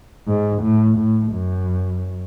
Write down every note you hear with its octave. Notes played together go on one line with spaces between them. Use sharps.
G#2
A2
A2
F#2